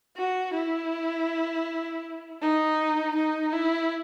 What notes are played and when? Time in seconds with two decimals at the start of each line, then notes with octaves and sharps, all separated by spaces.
0.16 F#4
0.54 E4
2.41 D#4
3.16 D#4
3.53 E4